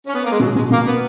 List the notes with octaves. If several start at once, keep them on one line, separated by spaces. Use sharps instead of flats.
C#4
B3
A#3
G#3
B2 F#3
B2 G#3
B2 A#3
A#3 B3